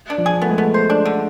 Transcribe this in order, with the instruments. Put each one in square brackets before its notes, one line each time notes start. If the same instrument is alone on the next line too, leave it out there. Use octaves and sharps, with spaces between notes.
[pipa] D4
[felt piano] F3
[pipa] G#4
[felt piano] A3 [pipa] B3
[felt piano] G#3
[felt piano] A3 [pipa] B3
[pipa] C5
D4
D3